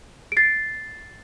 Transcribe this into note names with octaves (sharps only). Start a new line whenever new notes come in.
D7
A6 C7